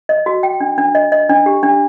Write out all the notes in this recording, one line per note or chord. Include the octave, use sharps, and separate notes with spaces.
D#5
F#4
G5
D4
D4
D#5
D#5
D4
G4
D4